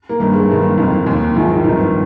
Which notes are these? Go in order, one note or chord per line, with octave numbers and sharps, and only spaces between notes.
A#3
G1 G2 D#3 A#3
G#3
G1 G2 D#3 A#3
F1 F2 D#3
D#2 D#3
A#1 G#2 D#3 F3 F4
G1 F2 D#3 D#4